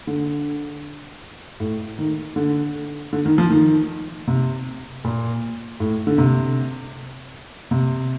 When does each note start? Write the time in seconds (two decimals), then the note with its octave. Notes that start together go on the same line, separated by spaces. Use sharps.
0.07 D3
1.60 A2
1.99 D#3
2.36 D3
3.13 D3
3.26 D#3
3.38 F3
3.50 D#3
4.27 C3
5.05 A#2
5.80 A2
6.07 D3
6.18 C3
7.71 C3